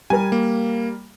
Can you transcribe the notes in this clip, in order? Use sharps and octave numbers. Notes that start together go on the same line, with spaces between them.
G3 A#4 G#5
A#3